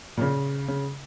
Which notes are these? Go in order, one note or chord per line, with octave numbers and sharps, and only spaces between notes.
A#2
C#3
C#3